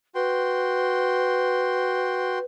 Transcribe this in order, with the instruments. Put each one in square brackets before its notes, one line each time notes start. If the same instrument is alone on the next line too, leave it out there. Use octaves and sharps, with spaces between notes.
[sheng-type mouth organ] F#4 G5 C6 [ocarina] B4